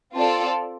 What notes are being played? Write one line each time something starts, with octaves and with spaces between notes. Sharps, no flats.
C4 F4 A4 D5